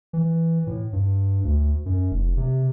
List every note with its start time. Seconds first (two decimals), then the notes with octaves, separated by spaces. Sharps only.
0.13 E3
0.67 A2
0.93 G2
1.44 D2
1.86 F#2
2.11 F1
2.37 C3